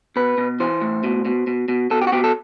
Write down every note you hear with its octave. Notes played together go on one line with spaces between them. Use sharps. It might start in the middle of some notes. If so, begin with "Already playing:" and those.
B2 B4
B2
E3 C5
A2
B2
B2
B2
B2
B2 A4
G4
F#4
B2 G4
A4